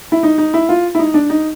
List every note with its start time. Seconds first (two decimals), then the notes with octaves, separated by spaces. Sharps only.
0.12 E4
0.23 D#4
0.38 D#4
0.54 E4
0.69 F4
0.95 E4
0.99 D#4
1.14 D4
1.30 D#4